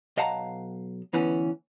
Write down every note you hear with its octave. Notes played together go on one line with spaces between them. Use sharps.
B1 D#5 F5 F#5 A5 A#5
D2 E3 B3 C#4